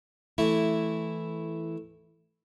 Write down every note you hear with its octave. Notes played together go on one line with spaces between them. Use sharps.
E3 A3 E4